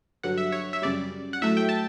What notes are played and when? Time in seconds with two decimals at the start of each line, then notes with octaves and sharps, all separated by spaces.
0.23 G2 D3 F#3 F#5
0.38 E5
0.52 C#5
0.73 E5
0.82 F#2 C#3 G3 D5
1.33 F#5
1.41 A2 F#3 A3 E5
1.57 G5
1.69 A5